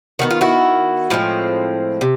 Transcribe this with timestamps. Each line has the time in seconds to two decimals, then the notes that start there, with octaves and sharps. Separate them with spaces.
0.19 D#3 G#3 B3 F#4
0.31 F4
0.41 E4 F#4
1.10 A2 F3 G#3 C4
2.01 C3